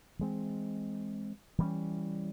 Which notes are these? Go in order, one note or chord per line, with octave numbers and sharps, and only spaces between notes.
E3 G#3 C4
E3 G3 A#3 C#4